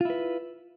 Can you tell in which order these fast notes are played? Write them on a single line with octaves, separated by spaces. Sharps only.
F4 E4 B4